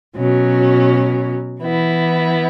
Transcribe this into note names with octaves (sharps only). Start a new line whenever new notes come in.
B2 F#3 C#4
E3 B3 E4